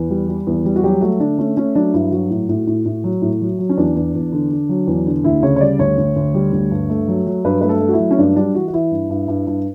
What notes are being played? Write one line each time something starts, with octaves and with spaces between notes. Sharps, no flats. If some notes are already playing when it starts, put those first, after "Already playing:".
Already playing: E2 B4
G3
G3
E2
G3
F#4
F#3 G4
A3 F#4
D3 D4
A3 C#4
A3 C#4
F#3 D4
G2 E4
F#3 F#4
A2
A2
A2
A2
F#3
A2
F#3
F#3
C#4
E2 D4
E2
E2
D3
D3
F#3
E2
D3
D2 E4
C#3 C#5
C#5
G3 D5
D2 C#5
D2
D2
G3
D2
G2
A3
F#3
F#3
G2 B4
A3 B4
A4
A3
F#4
E4
F#3
C#4
G2 D4
G3 D4
E3 F#4
F#4
E3 E4
G2
G2
G2
G2